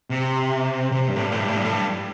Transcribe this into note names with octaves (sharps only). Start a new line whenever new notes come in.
C3
C3
G2
A2
G2
A2
G2
A2
G2
A2
G2